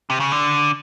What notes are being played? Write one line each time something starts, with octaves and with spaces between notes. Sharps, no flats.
C3
C#3
D3